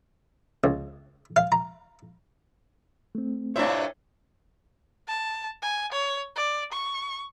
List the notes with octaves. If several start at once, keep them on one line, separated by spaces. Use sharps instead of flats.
C#2
F5
A#5
A3 C4
G2 A#2 D4 E4 C5 C#5 E5
A5
G#5
C#5
D5
C#6